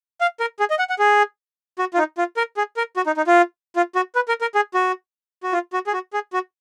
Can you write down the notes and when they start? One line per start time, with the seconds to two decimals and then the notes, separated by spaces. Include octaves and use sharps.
0.21 F5
0.40 A#4
0.60 G#4
0.70 D#5
0.79 F#5
0.90 F#5
0.99 G#4
1.79 F#4
1.94 F4
1.98 D#4
2.18 F4
2.37 A#4
2.57 G#4
2.77 A#4
2.97 F#4
3.07 D#4
3.17 D#4
3.27 F4
3.76 F4
3.95 F#4
4.15 B4
4.28 A#4
4.41 A#4
4.55 G#4
4.74 F#4
5.43 F#4
5.53 F4
5.73 F#4
5.87 G#4
5.93 F#4
6.13 G#4
6.33 F#4